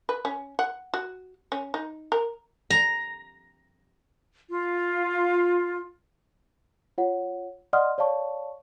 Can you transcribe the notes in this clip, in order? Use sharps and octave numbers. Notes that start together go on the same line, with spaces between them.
B4
C#4
F#5
F#4
C#4
D#4
A#4
A#5
F4
F4 C#5 F#5
D5 D#5 F#5 C6 D#6 F6
C#5 D5 F5 A5 C#6